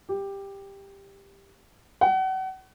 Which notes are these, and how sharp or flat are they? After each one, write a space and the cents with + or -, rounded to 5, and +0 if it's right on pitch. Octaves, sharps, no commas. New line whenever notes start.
G4 +10
F#5 +35